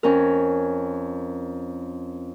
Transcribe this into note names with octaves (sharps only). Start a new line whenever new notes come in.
F2 C#4 A#4